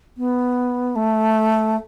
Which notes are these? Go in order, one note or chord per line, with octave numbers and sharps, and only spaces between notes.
B3
A3